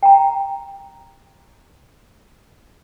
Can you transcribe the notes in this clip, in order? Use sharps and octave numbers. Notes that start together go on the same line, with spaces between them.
G5 A#5